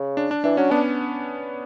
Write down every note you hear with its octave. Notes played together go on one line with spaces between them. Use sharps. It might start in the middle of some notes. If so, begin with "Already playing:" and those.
Already playing: C#3
D4
D4
E3 D4
F#3 C#4
B3 D4